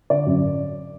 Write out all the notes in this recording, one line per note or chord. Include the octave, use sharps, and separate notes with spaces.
D3 D5
F#2